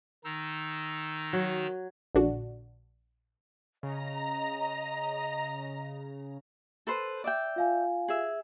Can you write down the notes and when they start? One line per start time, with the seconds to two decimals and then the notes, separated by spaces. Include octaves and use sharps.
0.24 D#3 D#4 E6
1.33 F#3
2.15 A#1 D3 D4 F#4
3.83 C#3 D#5 A#5
6.87 A4 B4 C5
7.24 D5 E5 G5
7.56 F4 F5 G#5
8.08 G#4 E5